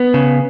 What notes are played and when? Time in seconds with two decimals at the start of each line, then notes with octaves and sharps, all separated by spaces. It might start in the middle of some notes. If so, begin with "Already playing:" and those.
Already playing: B3
0.14 C#3